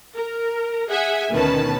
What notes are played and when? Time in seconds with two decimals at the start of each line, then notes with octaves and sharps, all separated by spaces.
0.16 A#4
0.90 G#4 E5 F#5 G#5
1.31 D2 B2 D#3 C#4 B4 A5